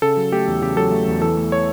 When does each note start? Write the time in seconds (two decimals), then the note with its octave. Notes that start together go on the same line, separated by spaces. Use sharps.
0.02 C#3 A4
0.17 F#3
0.32 A3 G4
0.48 E2
0.62 C#3 G4
0.77 F#3 A4
0.92 A3
1.08 E2
1.22 E3 A4
1.37 A3
1.52 C#5